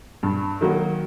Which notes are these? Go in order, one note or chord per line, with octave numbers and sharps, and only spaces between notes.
G2
D#3 F#3 A#3